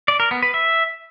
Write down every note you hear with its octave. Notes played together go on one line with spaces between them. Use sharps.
D5
A#4
B3
B4
E5